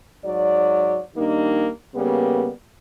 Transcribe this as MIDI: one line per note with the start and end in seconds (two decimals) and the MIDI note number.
0.25 1.00 44
0.25 1.00 54
0.25 1.00 74
1.15 1.68 51
1.15 1.68 55
1.15 1.68 58
1.15 1.68 62
1.15 1.68 63
1.95 2.48 49
1.95 2.48 55
1.95 2.48 58
1.95 2.48 59